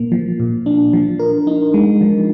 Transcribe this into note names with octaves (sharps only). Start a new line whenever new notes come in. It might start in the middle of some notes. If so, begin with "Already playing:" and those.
Already playing: A#2 A#3
F3
A#2
D4
F3
A#4
D#4
G#3
F3